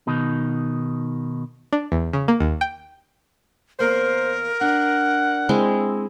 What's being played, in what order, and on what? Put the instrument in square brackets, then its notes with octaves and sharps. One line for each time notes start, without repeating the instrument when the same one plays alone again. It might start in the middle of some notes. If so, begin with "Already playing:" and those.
[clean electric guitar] B2 D#3 D#4
[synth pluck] D4
E2
C#3
A#3
D#2
G5
[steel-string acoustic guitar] E2 A#3 [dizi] A#4 [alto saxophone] C5
[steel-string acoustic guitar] D4 [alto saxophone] F#5
[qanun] G#3 C4 E4